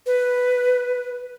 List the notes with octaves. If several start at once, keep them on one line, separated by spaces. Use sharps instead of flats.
B4